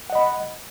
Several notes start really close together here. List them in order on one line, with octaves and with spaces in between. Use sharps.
F#5 D#5 B5